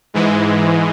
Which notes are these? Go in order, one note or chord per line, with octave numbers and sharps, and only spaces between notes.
G#2 E3 G#3